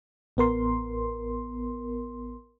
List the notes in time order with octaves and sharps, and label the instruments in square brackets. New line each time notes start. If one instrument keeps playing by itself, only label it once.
[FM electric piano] A1 B3 A#4 C6